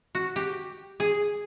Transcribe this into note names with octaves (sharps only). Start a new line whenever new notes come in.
F#4
G4
G#4